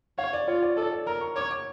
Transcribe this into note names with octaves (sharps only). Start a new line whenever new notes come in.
C#5 F5
D5
F4 C#5
D5
A4 D5
D5
A#4 A#5
C#6
C#5 D6
D6